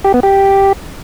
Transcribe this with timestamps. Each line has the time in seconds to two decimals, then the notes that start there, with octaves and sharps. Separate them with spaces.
0.05 G4
0.14 B3
0.23 G4